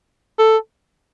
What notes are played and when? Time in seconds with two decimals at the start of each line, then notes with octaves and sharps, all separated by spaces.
0.39 A4